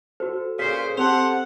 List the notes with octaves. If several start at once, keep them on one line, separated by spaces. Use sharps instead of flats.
F#4 A4 C5
A#2 C#3 C5 B6 C7
C4 G4 A4 C5 F#5 A5 F7